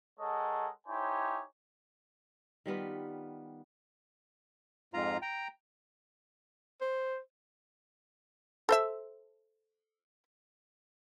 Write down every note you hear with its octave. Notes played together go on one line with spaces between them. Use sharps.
G#3 A4 A#4 C#5 D#5 F#5
D#4 E4 G4 C5 C#5 G#5
D#3 G3 B3 F4
F2 G#2 F4 A#5
G5 A#5
C5
A4 C5 E5